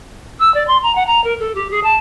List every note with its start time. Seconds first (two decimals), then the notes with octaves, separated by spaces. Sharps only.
0.40 E6
0.54 D5
0.68 C6
0.83 A#5
0.95 F#5
1.07 A#5
1.24 A#4
1.40 A4
1.55 G4
1.71 G#4
1.84 A5